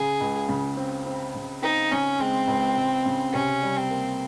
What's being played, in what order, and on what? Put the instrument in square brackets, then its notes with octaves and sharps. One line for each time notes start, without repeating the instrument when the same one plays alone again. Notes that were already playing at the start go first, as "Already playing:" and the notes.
Already playing: [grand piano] C#3 [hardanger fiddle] G#4
[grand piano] C#2
C#3
C4
C4
C#3
[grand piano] C4 [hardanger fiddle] D#4
[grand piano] C#3 [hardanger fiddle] C#4
[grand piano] G#3 [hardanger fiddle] C4
[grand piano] C#2
C#2
C#3
[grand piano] C3 [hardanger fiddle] C#4
[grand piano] G3
[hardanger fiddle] C4
[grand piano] A#3